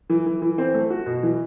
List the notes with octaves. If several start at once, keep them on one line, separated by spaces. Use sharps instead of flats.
E3
E3
E3
C4
A3
F#4
B2
E3